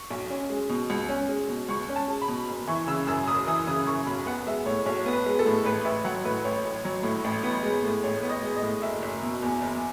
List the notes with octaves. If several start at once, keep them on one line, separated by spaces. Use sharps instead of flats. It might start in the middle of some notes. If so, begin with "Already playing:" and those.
Already playing: C#6
B1
C#4
G#3
B2
C#2
C#4
G#3
B2
C#2 C#6
C#4
A5
G#3
B5
B2
F#1
E3 C#6
C#3 E6
F#2 E6
F#1 D#6
E3 D#6
C#3 D#6
F#2 C#6
B1 B5
B3 F#5
G#3 E5
A2 C#5
B1 C#5
B3
B4
G#3
A4
A2
A1 B4
A1 E5
F#3 F#5
A2 B4
A1 C#5
A1
F#3
A2
A1
B3
G#3
A2
A1 C#5
B3
D#5
G#3
D#5
A2
F#1 E5
F#1
B2
E2
F#1